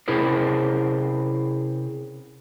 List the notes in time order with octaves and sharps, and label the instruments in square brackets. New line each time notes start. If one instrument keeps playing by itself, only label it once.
[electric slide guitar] C3 C#4 E4 G#4 A#4 C5